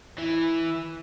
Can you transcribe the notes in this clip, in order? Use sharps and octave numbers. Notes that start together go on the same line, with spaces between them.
E3